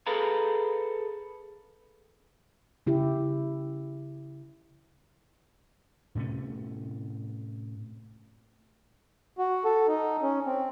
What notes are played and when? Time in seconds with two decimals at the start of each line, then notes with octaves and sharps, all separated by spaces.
0.07 G#4 A4 B4 F5 A#5
2.87 C#3 E4 G4
6.15 A2 C3 A3 C#4
9.38 F#4
9.65 A4
9.88 D#4
10.22 C#4
10.46 C4